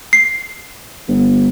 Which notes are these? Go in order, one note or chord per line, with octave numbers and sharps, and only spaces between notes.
C7
G1